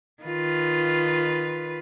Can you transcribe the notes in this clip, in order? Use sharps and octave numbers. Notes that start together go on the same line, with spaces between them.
D#3 F4 B4